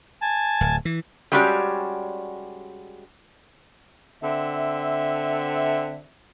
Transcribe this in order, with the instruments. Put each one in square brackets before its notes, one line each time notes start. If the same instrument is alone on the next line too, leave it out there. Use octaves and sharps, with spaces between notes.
[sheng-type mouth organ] G#5 A5
[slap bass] D1
E3
[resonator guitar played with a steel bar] G3 G#3 C#4 F#4 G4 D5
[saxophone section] D3 C4 E5